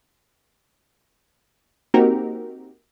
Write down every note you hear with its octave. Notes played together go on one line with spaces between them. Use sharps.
A#3 C4 D#4 F#4 G4 A#4